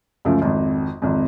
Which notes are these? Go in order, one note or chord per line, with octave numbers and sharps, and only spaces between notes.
C#2 F#2 F3 A3
G#1 F2
G#1 F2